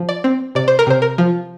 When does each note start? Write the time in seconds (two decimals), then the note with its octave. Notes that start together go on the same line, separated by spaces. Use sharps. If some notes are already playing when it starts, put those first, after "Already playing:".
Already playing: F3
0.09 D5
0.24 C4
0.55 C3 D5
0.68 C5
0.79 A#4
0.87 C3 C5
1.02 A#4
1.18 F3